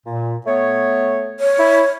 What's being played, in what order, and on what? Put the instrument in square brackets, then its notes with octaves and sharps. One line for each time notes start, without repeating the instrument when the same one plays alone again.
[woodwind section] A#2
A3 B3 C#5
[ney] C#5
[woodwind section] E4